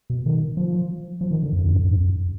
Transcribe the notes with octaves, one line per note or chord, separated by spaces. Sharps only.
B2
D#3
F3
F3
D#3
D3
F2
F#2
G#2
F2
F#2